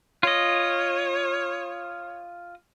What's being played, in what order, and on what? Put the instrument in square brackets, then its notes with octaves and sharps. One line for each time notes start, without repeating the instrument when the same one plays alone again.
[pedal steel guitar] F4 D#5 [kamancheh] C#5